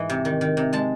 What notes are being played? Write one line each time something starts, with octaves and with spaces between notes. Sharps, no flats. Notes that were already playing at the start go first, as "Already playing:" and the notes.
Already playing: G#2 E3 D#5
C3
D#3
D#3
C3
G#3 A5